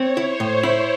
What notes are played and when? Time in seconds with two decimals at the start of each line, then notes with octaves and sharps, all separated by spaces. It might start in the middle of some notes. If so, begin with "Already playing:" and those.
Already playing: C4 C#5
0.17 E4
0.25 C5
0.40 A2
0.63 E4